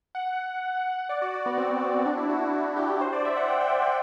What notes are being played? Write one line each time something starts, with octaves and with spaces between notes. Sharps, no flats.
F#5
D5
F#4
F#4
B3
C4
D4
E4
F#4
F#4
G4
C5
D5
E5
F#5
G5
G5
G5
F#5